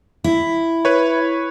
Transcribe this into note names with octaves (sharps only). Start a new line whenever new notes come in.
E4
B4 C#5